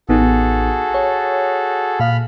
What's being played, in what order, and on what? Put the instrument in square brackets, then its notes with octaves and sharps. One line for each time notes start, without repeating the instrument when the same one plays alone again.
[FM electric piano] A1 B3 D#4 [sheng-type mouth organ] F#4 G#4 A4
[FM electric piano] C#5
[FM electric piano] A#2 F5 [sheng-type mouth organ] B5 F6